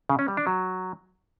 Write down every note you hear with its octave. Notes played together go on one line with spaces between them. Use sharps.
C#3
C#4
G3
D4
F#3